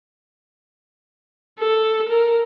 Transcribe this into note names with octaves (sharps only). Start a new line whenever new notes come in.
A4
A#4